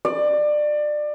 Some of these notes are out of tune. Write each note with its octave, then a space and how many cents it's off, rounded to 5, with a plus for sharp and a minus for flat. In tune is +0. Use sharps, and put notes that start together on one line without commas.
D5 +25